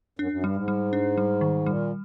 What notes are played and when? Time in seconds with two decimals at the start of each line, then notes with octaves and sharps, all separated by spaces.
0.19 F#2 D4
0.31 F#2
0.43 G2 G3
0.56 G#2
0.68 G3
0.93 D4
1.18 G3
1.41 D#3
1.66 A#2 G3